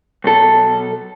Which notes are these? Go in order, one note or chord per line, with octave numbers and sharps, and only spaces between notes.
B1 A4